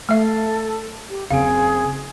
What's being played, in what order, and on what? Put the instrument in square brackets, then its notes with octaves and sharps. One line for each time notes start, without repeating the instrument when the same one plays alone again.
[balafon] A3 E5 [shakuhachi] A4
[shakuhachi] G4
[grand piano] F#1 C4 D7 [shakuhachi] G#4 [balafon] F5